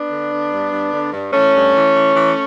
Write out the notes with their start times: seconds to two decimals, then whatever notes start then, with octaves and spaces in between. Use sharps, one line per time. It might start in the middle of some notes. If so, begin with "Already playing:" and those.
Already playing: B3 D4
0.10 D3
0.31 D3
0.51 G2
0.71 G2
0.92 D3
1.12 G2
1.33 E3 A3 C#4
1.53 G2
1.74 E3
1.94 E3
2.15 E3